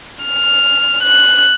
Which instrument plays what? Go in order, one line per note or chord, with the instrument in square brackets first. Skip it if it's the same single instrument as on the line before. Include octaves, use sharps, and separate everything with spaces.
[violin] F6
F#6